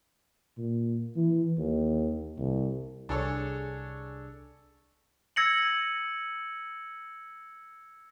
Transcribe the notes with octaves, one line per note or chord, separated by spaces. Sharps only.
A#2
E3
D#2
C2
C2 D4 G#4 A4 C#5
E6 G#6 A#6 C#7 D#7 F#7